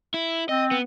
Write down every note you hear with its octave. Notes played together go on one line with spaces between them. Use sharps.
E4
C4 D#5
B3